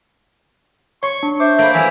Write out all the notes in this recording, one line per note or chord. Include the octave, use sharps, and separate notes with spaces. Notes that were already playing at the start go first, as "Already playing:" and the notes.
C#5 C6 C#6
D4
C5 E5 D6
A3 A#3 D5 B5 G6
E3 F#3 G3 E5 G#5